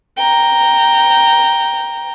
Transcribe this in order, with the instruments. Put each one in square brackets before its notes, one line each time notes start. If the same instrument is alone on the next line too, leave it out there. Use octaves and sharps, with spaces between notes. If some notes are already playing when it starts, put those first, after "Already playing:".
[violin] G5 A#5